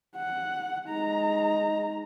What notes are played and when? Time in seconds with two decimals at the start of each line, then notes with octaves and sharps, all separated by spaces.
0.16 F#5
0.87 G#3 D#4 A#5